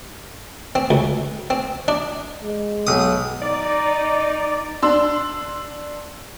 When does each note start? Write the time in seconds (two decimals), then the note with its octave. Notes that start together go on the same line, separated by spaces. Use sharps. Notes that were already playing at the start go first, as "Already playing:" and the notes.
0.75 C4
0.91 C#2
1.50 C4
1.88 D4
2.42 G#3
2.87 B1 D#6
3.42 D#4 D5
4.82 D4 C6 E6